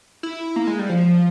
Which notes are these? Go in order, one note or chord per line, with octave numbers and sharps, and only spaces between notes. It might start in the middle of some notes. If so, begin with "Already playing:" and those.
E4
A#3
G#3
G3
F3